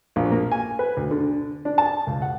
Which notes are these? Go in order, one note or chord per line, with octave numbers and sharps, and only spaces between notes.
A#1
A#3
G#5
B4
D2
D3
D4
A5
C#2
F#5